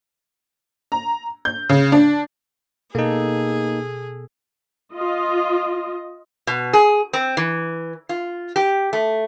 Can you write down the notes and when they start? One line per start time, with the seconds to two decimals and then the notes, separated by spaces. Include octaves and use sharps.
0.92 A#5
1.45 G6
1.69 C#3
1.92 D4
2.95 B2 A#3 D#4 G#4 A4
4.93 F4 D#5
6.47 B2
6.73 G#4
7.13 C4
7.37 E3
8.09 F4
8.56 G4
8.93 A3